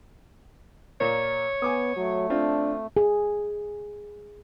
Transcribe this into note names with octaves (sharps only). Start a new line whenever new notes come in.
A#2 A#3 C#5
B3 G#5 D6 D#6
F#3 A3
C4 D4 F4
G#4